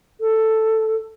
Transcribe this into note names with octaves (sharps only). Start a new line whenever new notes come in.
A4